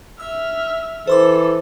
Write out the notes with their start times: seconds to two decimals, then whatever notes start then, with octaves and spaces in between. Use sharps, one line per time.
0.20 E5 E6 F6
1.07 E3 A4 C5 C6 D6